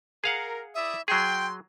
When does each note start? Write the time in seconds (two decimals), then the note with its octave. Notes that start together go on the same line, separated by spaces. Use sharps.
0.24 G#4 A#4 F5 F#5
0.75 E4 D5 E5 D#6
1.08 F#3 G#4 G5 C6